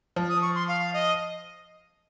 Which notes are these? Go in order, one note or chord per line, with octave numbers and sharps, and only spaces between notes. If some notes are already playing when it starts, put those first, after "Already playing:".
F3
D#6
C#6
C6
F5
D#5